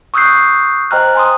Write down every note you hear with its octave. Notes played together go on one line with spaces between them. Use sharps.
C#6 D#6 E6 F#6 G6 C7
C5 D#5 G5 A#5 F6 F#6
G#5 C6 D#6